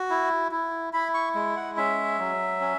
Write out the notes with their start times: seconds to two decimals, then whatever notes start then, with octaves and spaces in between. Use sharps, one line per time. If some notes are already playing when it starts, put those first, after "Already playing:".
Already playing: F#4
0.10 E4
0.52 E4
0.93 E4 B5
1.14 C#6
1.35 G#3
1.56 F#5
1.77 C#4 E5
2.18 F#3
2.61 C#4